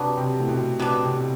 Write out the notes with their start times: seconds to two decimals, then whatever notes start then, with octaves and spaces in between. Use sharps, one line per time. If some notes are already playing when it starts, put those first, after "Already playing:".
Already playing: C3 F#3 B3 D4
0.17 C3
0.40 A2
0.48 B2
0.79 B2 F#3 B3 D4
1.03 C3